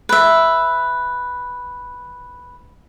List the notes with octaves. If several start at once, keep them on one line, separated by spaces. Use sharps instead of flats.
B4 E5